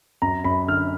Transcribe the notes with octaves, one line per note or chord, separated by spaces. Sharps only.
F#2 A#5
F#2 B5
D3 F6